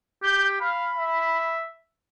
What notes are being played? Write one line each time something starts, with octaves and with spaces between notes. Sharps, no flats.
G4 G6
F5 B5
E5